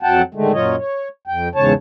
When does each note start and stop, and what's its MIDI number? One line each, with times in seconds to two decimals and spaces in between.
0.03 0.22 41
0.03 0.22 54
0.03 0.22 78
0.03 0.22 79
0.03 0.22 81
0.34 0.52 45
0.34 0.52 50
0.34 0.52 51
0.34 0.52 56
0.34 0.52 57
0.53 0.76 42
0.53 0.76 46
0.53 0.76 54
0.53 0.76 65
0.53 0.76 73
0.53 0.76 75
0.78 1.08 73
1.27 1.48 41
1.27 1.48 79
1.55 1.73 40
1.55 1.73 44
1.55 1.73 49
1.55 1.73 73
1.55 1.73 81